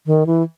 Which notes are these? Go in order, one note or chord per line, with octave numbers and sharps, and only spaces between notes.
D#3
E3